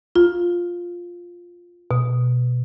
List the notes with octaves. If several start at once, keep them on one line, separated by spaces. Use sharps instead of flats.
F4
B2